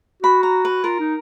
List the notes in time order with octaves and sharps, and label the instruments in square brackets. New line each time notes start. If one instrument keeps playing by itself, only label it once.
[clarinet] F#4 [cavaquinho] B5
[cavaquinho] A#5
B4
[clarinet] F4 [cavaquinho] A#4
[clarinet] D#4